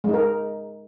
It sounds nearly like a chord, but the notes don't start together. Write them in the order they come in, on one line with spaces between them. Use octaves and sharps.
G#3 D#4 A#4